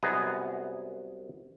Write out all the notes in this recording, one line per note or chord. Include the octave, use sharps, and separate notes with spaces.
C2 F#2 B3 G#4 D#5 A#5